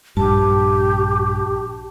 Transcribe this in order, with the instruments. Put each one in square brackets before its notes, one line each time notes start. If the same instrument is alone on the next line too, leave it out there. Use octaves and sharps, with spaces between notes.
[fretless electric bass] A#1 G2 [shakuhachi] G4 [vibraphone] A5